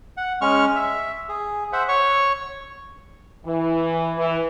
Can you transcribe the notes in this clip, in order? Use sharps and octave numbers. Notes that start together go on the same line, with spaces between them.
F#5
G#3 C#4 C#6 F6
E5
G#4
C5 E5 F#5
C#5 C#6
E3
E3